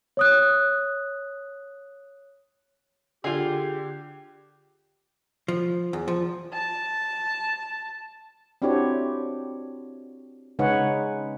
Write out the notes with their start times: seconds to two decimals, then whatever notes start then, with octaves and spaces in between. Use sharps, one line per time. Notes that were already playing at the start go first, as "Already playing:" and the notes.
0.17 C#5 D#6 F#6
3.24 D3 F4 G4 G#4 C7 F7
5.48 F3
5.93 E2
6.08 F3
6.53 A5
8.62 C4 D4 E4 F#4 G4 C#5
10.59 C#3 G#3 D#4 B4 C#5 F#5